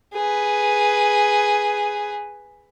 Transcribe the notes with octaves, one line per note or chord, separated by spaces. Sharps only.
G#4 B4